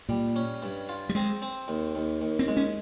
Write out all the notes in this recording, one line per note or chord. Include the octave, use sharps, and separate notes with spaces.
A#2 G3
C#4
G2
F4
G3
G#3 C4
C4
D#2
D#2
D#2
C4
G#3
C#4